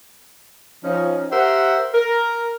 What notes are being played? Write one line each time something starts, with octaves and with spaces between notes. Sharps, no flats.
F3 C#4 D#4
G4 A#4 C5 E5 F#5
A#4